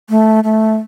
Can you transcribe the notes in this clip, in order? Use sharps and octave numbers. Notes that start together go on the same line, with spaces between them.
A3
A3